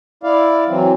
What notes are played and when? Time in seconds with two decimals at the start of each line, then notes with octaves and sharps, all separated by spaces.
0.23 E4 D5 F5
0.68 E3 F#3 C4